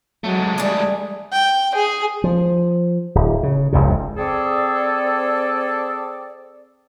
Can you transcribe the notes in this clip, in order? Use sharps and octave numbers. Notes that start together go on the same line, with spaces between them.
F#3 G#3 A3
G3 D4 G#4
G5
G#4
F3
D1
C#3
F1 C#2 G2 C3
C4 G#4 A4 D5